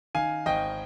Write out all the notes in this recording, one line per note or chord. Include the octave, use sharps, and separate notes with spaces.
D#3 F5 G#5
G#1 D#5 G5